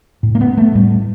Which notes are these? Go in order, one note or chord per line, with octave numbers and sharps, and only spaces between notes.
A2
A#3
B3
A3
A2 G3